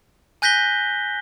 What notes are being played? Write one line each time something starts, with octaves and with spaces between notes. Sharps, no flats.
G#5 F#6 G6 A#6 B6 G7